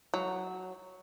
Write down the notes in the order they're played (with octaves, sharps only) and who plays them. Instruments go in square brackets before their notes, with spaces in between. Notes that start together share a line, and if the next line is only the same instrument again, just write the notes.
[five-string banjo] F#3